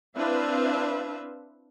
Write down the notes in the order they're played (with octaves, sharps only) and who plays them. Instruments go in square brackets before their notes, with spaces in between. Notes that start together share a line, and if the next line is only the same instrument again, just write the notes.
[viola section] C4 D4 E4 B4 E5 F5